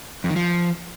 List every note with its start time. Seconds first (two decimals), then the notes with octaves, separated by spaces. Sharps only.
0.24 F2
0.30 D#3
0.36 F3